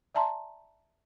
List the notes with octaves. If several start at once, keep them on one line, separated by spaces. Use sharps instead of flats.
D5 E5 A5 A#5 C6